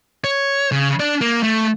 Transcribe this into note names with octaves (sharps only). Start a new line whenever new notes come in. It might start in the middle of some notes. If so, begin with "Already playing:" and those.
C#5
C#3
D4
A#3
A3